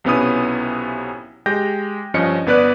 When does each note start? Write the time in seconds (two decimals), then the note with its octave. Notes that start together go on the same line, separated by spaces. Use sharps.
0.04 B1 C3 B3 C#4 E4 D#6
1.46 G#3 G4 G5 G6 A#6
2.14 G2 F3 C#4 D#5 C#7
2.46 G1 B3 B4 D5 F#6